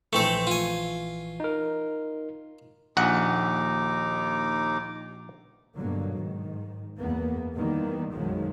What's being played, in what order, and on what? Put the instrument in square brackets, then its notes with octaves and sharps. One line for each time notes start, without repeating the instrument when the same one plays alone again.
[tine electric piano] A#1 E3 C#6 [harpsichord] A3 C4 A4
[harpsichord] F4 G#5
[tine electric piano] D#4 A#4
[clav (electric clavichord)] A#1 F#5 [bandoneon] D#2 D#4 D6
[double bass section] G2 B2 D3 F#3 A#3
G#2 D#3
F#1 E2 A#3 B3
D#3 E3 G3 A#3 B3
B1 F#2 D#3 F3 F#3 G#3